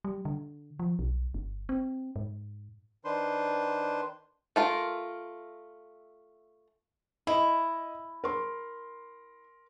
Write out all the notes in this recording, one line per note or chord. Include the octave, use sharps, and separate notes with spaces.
G3
D3
F3
B1
G1
C4
G#2
D#3 D4 B4 C5 C6
A3 F4 A#4
E4 D#5
A#4 C6